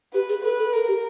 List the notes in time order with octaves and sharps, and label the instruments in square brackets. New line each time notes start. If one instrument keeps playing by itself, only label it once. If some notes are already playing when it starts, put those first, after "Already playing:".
[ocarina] G4 [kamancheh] B4
[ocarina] G#4
[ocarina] A4 [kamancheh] B4
[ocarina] A4
[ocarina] A4 [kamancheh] A#4
[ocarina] G4